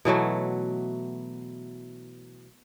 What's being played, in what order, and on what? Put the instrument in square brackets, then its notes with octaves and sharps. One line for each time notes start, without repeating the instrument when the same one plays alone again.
[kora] B2 E3 F#3 A3